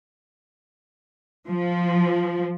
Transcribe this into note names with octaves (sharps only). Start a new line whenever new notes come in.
F3